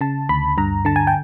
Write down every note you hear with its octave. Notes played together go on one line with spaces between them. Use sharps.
C#3 A5
D2 B5
G2 A#5
D3 A5
G#5
G5